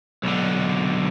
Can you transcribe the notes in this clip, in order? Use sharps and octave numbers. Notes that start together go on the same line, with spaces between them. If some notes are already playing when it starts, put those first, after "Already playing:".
B1 D3